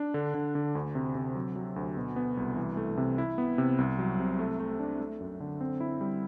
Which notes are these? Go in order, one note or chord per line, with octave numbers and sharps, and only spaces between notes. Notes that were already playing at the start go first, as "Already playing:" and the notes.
Already playing: D4
D3
D3
D3
D2
C3
C3
F#3
F#3
D2
B2
B3
C2
E3
A3
C3
E4
B3
C3
C2
F#3
C3
A3
A3
D4
A3
F#2
D3
C4
E4
G3